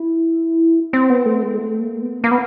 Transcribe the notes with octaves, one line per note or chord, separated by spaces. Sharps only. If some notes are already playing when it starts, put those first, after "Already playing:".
Already playing: E4
C4
B3
A3
G#3
A3
A#3
B3
A#3
B3